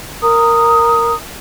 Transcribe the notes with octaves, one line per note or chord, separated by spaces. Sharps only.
A#4 A#5 D#6